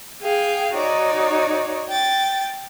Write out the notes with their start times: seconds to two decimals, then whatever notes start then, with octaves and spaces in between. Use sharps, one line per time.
0.22 G#4 F5 G5
0.74 D#4 F#4 C#5 D5
1.89 G5 A6